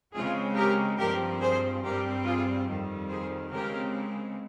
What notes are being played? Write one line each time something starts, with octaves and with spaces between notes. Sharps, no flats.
C#3 G#3 C4 F4 G#4
G4 A#4
G2 F3 C4 G4 A#4
G#4 C5
G2 G3 C4 G4 A#4
F4 G#4
F2 D#3 G3
G#4 C5
C#3 G#3 C4 G4 A#4